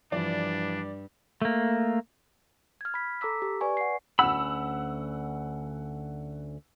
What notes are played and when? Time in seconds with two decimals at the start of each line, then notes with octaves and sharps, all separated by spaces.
0.12 G2 E3 F3 D4 D5
1.42 A3 A#3
2.81 F6 G#6
2.94 B5 B6
3.21 A4 A#5 D6 E6 B6
3.42 G4
3.61 B4 D5 G#5 C#6
3.77 F#5 C7
4.19 D2 C#4 F#5 B5 E6